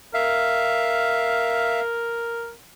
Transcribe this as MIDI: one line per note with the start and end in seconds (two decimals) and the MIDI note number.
0.14 2.52 70
0.14 1.80 76
0.14 1.80 77